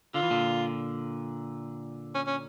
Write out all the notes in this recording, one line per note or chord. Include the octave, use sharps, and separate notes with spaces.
D3 F4
E3
A#2 D3
C#4
C#4